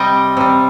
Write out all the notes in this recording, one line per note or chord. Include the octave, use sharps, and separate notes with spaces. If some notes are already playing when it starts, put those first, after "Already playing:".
Already playing: C3 G3 D#5 G5
C3 G3